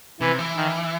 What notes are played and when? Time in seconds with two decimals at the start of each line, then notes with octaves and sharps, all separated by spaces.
0.20 C3 E3
0.39 E3
0.56 D#3